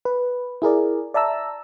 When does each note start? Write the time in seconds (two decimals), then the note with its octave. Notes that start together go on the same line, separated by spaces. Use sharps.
0.05 B4
0.62 E4 G#4 A#4 D5
1.14 D5 E5 A5 A#5 E6